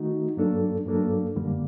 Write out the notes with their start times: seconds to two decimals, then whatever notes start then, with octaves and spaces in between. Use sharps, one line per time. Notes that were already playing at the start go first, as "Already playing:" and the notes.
Already playing: D#3 A3 D#4 F#4
0.37 G2 F#3 A#3 D4 A4
0.86 G2 F#3 A#3 D4 A4
1.36 F#2 D3 G3 A#3